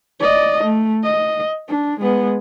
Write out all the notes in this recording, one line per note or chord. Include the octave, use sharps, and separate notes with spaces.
D5 D#5
A3
D#5
D4
G#3 B3